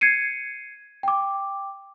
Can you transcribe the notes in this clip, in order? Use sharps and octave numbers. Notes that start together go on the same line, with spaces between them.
G#6 C7 C#7 D#7
G5 D6